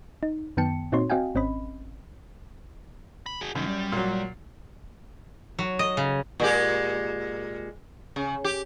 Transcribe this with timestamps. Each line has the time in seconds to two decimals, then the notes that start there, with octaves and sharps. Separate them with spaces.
0.23 D#4
0.57 F#2 D#3 B3 G5 A5 C#7
0.92 A#2 C4 D#4 F#4 C#5 C6
1.10 C4 F#4 D#5 F5 G5 G#5
1.35 G#1 C4 C#4 D#5 B5
3.26 B5
3.41 F#4 G#4
3.55 C2 F#2 D#3
3.67 G3
3.92 A#2 F#3
5.59 F#3
5.79 D#5
5.97 C#3
6.40 A#2 G#3 G4
8.16 C#3
8.44 G4